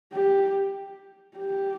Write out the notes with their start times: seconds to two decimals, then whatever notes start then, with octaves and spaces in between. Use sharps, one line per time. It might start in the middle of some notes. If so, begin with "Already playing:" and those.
0.13 G4
1.37 G4